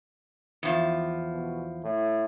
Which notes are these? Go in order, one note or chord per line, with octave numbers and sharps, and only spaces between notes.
E2 F3
B2
A2